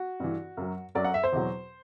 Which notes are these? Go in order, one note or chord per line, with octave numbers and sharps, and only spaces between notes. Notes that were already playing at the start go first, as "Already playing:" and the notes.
Already playing: F#4
G2 E3
F#2 F#3
F#2 F#3 D5
F#5
E5
C5
E2 B2 F#3